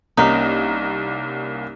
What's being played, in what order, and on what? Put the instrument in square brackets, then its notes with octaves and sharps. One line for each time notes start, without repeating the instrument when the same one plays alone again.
[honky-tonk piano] C2 A#3 C#4 [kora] D#4